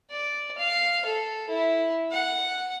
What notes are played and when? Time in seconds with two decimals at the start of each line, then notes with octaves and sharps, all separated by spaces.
0.10 D5
0.58 F5 F6
1.05 A4
1.49 E4
2.11 F#5